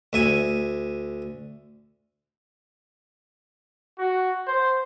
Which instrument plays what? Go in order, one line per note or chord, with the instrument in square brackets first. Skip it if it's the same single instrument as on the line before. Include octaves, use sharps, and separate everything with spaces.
[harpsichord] D2 E5 G#5
[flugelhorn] F#4
C5